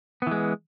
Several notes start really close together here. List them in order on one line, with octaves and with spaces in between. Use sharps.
B3 E3 G#3